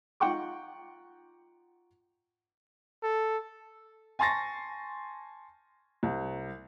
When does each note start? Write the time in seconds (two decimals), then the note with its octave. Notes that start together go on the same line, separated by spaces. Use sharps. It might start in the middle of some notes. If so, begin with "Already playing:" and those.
0.20 D#4 F4 F#5 G5 C#6 D6
3.03 A4
4.19 G#5 A5 C6 C#6 A6 A#6
6.03 C2